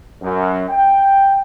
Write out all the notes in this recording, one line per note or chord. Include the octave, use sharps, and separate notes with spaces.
F#2
G5